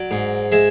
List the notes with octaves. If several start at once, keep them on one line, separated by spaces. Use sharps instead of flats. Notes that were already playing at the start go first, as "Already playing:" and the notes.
Already playing: F#3 D5
G#2
G#3 E5